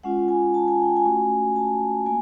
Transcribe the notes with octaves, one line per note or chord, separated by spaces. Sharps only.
G#3 C#4 F4 F#5
G#5
A5
G#5
G5
G#5
A3 C#4 F#4
A5
A#3 G#5